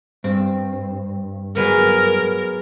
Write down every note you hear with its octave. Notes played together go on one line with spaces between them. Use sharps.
G2 C4
F#3 G#3 B3 A#4